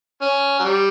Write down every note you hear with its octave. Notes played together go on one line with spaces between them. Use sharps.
C#4
F#3
G3